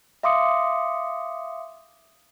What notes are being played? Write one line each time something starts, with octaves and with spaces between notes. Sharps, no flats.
E5 F5 C6 D6 D#6 C#7